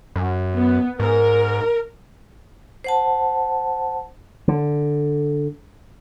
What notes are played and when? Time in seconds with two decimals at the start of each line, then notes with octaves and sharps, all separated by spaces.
0.16 F#2
0.55 B3
1.00 G#2 A#4
2.84 C5 F#5 A5
4.48 D3